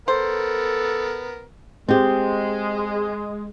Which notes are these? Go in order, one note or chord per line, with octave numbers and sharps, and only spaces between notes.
B3 A4 A#4 C5
G#3 C4 G4